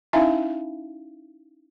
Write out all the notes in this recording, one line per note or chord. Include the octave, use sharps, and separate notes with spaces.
C#4 D#4 E4 E5 F5 G#5